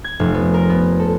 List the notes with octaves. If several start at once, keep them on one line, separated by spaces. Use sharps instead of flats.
G#6
F1
B3
A#4
B3
A4